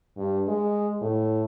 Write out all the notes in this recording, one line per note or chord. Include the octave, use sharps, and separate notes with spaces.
G2
G#3
A2